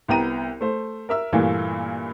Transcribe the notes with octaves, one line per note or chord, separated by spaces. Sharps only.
C2 B3 G5 A#5 D#7
A3 C5
A#4 E5 E6
G2 A#2 E3 A3 A#3